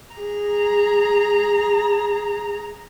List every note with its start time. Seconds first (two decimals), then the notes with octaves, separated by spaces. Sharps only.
0.15 G#4 A#5